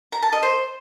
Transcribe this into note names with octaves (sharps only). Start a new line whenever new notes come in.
A#5
A5
D#5
C5